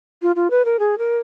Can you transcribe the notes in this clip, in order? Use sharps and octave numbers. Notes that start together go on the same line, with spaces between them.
F4
F4
B4
A#4
G#4
A#4